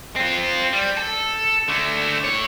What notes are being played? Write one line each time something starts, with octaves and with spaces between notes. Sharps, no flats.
C4 F4
G3
A4
D3 A3
A3 C#5